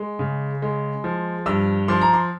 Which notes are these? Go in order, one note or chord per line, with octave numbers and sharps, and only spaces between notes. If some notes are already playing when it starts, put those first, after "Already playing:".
Already playing: G#3
C#3
G#3
F3
G2 E6
F3 C6
A#5
C6